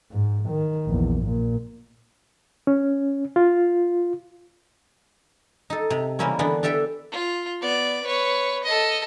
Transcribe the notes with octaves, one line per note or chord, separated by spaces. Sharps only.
G#2
D#3
A#1 E2
A#2
C#4
F4
D#4 A4
C3
C#3 E3 G3 A#3 C4 C#4
D3 E3 B3 D4
D4 G4 A4 E5 G5
F4
B3 D5
B4 C#5
A4 D#5